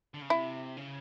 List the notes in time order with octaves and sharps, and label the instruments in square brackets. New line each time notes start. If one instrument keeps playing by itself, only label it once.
[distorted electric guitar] D3
C#3
[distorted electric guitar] C3 [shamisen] E4
[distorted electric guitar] C#3